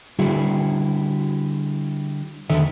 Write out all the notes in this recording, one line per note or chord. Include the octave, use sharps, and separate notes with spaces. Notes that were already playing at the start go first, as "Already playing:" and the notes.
D3 G3 E4 F#4 G#4
E2 D3 D#3 A4 E5